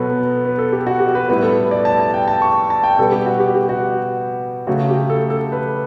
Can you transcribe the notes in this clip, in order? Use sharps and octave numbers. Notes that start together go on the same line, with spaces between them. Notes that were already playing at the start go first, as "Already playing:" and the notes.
Already playing: B2 F#3 B3 A4 B4
B4
A4
G4
F#4
G4
B4
A2 G3 B3 B4
A4
D5
A5
A5
G5
A5
C#6
A5
G5
B2 G3 B3 A4
G4
F#4
G4
G4
F#4
C#3 F#3 A3 F#4
G4
A4
A4
B4